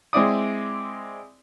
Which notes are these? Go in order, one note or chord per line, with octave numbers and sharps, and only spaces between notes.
G#3 C4 E4 D5 D#6